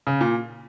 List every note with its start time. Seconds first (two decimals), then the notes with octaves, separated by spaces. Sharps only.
0.07 C#3
0.21 A#2